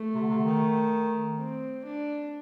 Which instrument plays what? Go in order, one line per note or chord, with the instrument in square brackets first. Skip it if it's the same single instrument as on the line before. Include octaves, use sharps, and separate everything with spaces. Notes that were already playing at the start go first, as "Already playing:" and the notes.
Already playing: [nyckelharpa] A3
[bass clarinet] C3
D3
C3
D3
D#3
[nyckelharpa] C4
D4